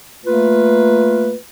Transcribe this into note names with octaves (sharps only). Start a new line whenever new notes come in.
A3 A#3 F4 B4